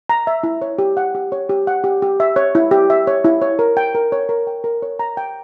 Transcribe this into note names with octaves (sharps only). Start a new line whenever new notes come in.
A#5
E5
E4
C#5
G4
F#5
G4
C#5
G4
F#5
G4
G4
E5
C#5
E4
G4
E5
C#5
E4
C#5
A#4
G5
A#4
C#5
A#4
G5
A#4
C#5
A#5
G5